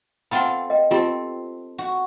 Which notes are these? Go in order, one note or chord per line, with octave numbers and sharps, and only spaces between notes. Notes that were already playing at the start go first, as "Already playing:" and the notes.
C4 F4 A4 F#5 G5 B5
D#5 G5
C4 F4 G4 A4
F#4